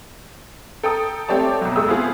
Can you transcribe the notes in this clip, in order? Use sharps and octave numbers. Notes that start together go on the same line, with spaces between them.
A4 G5 A#5 D#6
A3 C4 G4 C#5 D5 A5
B1 F#3
D#2 A2 G#3 A3 D#6 E6
B3 E4 F4 G#4 C5